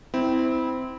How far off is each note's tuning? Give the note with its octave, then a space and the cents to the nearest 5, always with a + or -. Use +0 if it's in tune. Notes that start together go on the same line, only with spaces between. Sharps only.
C4 -20 E4 -15